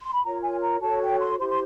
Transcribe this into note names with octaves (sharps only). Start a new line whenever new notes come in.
C6
B5
F4 A#4 C#5 A#5
G#5
A#5
F#4 A4 C#5 A5
G5
C6
E4 G4 C5 C6
C6